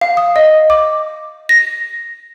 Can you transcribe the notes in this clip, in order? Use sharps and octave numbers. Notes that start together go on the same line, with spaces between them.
F5
D#6
D#5
D6
A#6